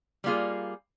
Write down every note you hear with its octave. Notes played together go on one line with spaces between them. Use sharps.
G3 A#3 F4 G#4